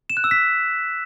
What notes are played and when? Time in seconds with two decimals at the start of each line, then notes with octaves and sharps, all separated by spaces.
0.10 E7
0.17 F#6
0.24 E6
0.31 B6